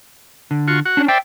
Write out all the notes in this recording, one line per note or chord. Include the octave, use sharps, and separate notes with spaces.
D3
F4 F#4 C#6
F#4 F#5
C#4 D4
C5 D5 E5 G5